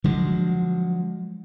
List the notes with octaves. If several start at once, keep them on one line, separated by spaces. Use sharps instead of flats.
D3 F3 F#3 G#3